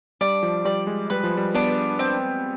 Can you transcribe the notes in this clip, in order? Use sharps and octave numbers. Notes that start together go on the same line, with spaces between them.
G3 D4
F3
G3 D5
G#3
G3 B4
F3
G3
B3 D4
C4